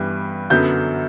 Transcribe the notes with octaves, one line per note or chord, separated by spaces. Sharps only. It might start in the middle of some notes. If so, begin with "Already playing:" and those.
Already playing: G2 E3 G3 B3
F#2 D3 F#3 B3 G6